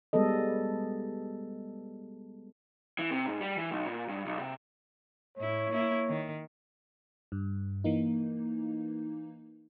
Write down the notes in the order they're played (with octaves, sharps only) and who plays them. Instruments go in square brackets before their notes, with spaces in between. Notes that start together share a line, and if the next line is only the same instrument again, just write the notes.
[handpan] G3 G#3 B3 A4 D#5
[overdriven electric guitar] E3
C3
G#2
G3
E3
B1
A#2
G2
B1
C3
[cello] A2 E4 [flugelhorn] C#5
[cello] A#3 E4
D#3
[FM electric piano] G2
E3 A#3 D#4